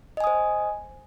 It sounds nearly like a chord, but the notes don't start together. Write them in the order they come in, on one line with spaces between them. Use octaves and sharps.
D#5 G#5 D#6 C5